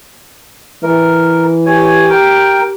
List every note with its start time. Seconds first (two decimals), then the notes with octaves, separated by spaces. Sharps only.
0.83 E3 A#4
1.66 G4 C#5 G#5
2.10 A#4 G5